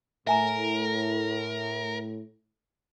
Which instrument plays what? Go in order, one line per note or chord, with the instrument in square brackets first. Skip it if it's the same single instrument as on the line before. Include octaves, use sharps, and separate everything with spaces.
[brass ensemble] A2 [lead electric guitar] A#4 [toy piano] E5 G#5 A#5